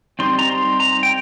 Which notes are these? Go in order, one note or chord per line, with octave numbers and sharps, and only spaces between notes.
G3 C4 D#4 C6
A#5
C6
A#5
G5